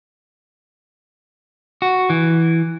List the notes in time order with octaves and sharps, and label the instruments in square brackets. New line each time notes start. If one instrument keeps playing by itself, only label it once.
[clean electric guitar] F#4
E3